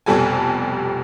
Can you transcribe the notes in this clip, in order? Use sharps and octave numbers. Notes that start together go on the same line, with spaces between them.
F1 F2 B2 G3 A4 G#5